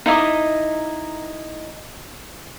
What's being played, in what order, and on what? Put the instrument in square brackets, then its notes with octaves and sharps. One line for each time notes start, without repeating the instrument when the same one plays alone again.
[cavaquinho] D#4 E4 D#5 D6